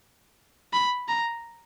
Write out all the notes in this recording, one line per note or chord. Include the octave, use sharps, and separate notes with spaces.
B5
A#5